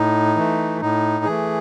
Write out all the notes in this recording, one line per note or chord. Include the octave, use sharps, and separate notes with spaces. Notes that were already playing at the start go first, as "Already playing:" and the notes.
Already playing: A2 D#4
E3 A3
A2 D#4
E3 A3 G#4